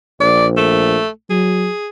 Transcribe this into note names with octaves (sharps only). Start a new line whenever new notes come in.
A#1 D5
A3
F#3 G#4